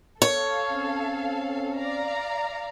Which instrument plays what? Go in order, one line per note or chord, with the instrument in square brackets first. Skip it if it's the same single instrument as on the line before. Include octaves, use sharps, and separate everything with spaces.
[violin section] A4 F5 [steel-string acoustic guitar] C#5
[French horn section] C4 C#4
[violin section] D5 F5 A#5